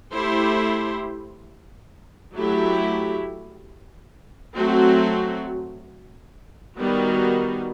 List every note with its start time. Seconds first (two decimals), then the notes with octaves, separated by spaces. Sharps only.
0.12 A3 E4 G4 C5
2.34 F#3 A3 E4 G4
4.56 F#3 A3 C4 F#4
6.77 D#3 G3 B3 F#4